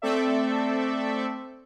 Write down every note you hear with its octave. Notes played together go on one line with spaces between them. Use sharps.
A3 C4 A4 D5 E5